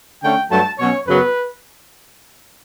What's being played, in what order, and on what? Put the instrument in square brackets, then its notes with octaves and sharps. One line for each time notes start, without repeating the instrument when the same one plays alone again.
[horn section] D3 A3 C#4 G5
G2 F#3 A3 A5
B2 F#3 C#4 C#5
F#2 C#3 F#3 B3 B4